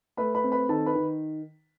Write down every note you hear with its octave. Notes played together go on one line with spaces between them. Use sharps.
A3 B4 B5
B4 B5
C4
B4 B5
D#3 A4 A5
B4 B5
D#3